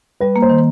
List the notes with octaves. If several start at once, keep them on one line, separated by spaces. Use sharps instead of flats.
G3 B4
A#3
C5
D#3